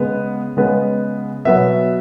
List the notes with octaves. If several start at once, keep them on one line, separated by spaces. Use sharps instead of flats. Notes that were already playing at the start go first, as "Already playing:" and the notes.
Already playing: C#3 G#3 B3
C#3 G#3 B3
B2 F#3 B3 E5